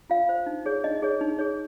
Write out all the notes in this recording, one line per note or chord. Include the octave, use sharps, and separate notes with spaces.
F4 F5
C5
D#4
G#4 C#5
D#4 D#5
G#4 C#5
D#4
G#4 C#5